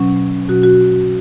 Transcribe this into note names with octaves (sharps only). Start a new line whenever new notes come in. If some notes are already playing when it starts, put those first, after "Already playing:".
Already playing: B2 F#3 C#4
B2 F#3 C#4 F#4
F#4